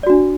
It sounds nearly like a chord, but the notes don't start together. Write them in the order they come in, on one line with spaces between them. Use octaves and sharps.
D5 F#4 D4